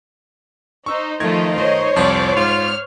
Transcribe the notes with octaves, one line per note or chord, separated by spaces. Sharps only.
D#4 C5 C#6 E6
D#3 F3 A3 F4 D#5 G#6
D#4 C5 C#5 D#5
C2 F2 F3 D5 D6
G#2 F4 F6